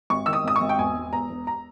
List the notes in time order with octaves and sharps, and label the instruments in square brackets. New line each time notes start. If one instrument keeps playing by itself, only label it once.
[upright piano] G#1 C#6
D#3 E6
D#6
G#1 D#6
C#6
G#1
G5
E1 G#5
E1
E2 A#5
E1
A#5